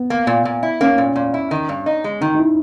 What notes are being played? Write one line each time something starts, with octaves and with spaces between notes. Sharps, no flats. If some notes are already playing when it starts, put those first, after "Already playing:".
Already playing: B3
A#3
A#2
A#2
E4
A#3 C#4
A#2
A#2
E4
D#3
G2
D#4
G#3
D#3 D#4
D#4
E4